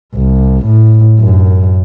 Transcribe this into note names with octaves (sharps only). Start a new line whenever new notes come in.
C2
A2
F#2